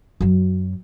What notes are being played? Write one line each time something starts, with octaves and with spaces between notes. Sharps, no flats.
F#2 F#3